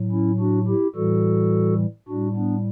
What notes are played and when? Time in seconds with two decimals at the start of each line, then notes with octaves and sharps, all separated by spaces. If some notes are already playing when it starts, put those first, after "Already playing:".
Already playing: A2 F#3
0.11 C#4 E4
0.40 D4 F#4
0.68 E4 G4
0.95 A2 E3 G3 F#4 A4
2.08 A2 G3 D4 F#4
2.36 B3 D4